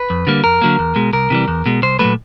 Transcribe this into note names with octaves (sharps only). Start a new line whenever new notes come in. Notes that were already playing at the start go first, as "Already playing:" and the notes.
Already playing: B4
F2
D3 G3 A#3
F2 A#4
D3 F#3 A#3
E2
B2 G#3
C2 A#4
C3 E3 G3
E2
B2 G#3
C2 C5
A#2 F#3 A3 B4